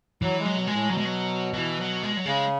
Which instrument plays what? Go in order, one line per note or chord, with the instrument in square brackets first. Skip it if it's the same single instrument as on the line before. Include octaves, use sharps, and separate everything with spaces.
[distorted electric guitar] E3 [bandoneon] F#3
[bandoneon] G#3
[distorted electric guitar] F#3
[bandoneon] B2
[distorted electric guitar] G#3
[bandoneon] A2
[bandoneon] B2 [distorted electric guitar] F#3
[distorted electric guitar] G#3
F#3
F#3
E3
F#3
G#3
F#3
[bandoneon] C#3 [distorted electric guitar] G#3